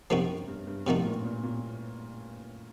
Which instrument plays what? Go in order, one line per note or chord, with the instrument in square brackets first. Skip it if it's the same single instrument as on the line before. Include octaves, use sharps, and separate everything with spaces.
[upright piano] F#2 [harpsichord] C3 F3 A#3 D#4 F#4
[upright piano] G2
G2
G2
[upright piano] A2 [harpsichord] C3 F3 A#3 D#4 F#4
[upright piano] A#2
A#2
A#2